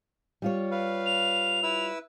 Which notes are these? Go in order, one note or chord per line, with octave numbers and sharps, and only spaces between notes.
G3 F4 C#5
B4 F5
F7
E4 B4 E6